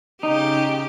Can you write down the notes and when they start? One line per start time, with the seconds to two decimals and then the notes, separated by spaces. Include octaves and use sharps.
0.23 C#3 D#4 G4